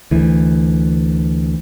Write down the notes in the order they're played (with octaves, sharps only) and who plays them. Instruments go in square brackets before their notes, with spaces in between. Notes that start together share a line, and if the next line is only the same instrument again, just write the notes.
[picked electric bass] D2 E3